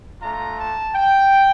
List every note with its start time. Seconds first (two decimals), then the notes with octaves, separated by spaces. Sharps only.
0.22 A3 D4 F4 A#5
0.57 A5
0.94 G5